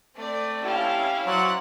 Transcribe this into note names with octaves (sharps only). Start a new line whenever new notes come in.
A3 C4 D5
C#4 E4 G4 F5 A5
F#3 C5 D5 F#5